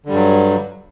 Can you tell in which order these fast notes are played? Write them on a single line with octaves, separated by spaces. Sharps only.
D3 G3 G2 F#3